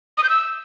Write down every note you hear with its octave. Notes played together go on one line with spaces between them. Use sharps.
D#6
G6
E6